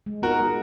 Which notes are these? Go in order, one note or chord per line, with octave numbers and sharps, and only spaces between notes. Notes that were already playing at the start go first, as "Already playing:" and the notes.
G#3
B3 D#4 F#4 G#4 A#4
G#3